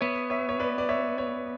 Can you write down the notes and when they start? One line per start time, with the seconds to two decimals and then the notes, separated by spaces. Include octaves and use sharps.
0.01 B3 C#5 E5
0.30 C#5 E5
0.49 C#5
0.59 B4 D5
0.78 D5
0.89 C#5 E5
1.18 C#5 E5